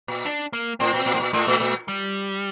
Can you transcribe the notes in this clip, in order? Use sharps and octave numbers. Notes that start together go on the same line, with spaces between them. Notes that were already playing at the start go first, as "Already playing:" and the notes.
A#2
D4
A#3
A2 C4
A#2
A#2
A2
A#2
A2 A3
A#2
A#2
G3